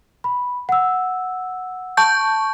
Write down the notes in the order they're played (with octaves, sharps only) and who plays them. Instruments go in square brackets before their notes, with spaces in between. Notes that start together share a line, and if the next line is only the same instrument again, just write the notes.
[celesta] B5
F#5 E6
[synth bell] A5 C#6 G6